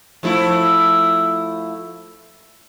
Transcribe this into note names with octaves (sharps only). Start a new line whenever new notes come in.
F3 A3 E4